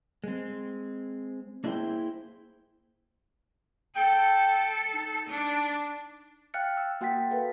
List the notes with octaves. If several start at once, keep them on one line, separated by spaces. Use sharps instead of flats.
G#3 C4
A#3 D4 E4 G#4 C5 G5
A4 G5
D#4
D4
F5 G5 F6 F#6 A6 C#7
E6
A#3 F#4 F#5 G5 A6 B6
A4 B4 F5